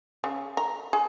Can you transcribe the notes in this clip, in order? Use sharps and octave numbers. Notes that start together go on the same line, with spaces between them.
C#3
A#5
G#4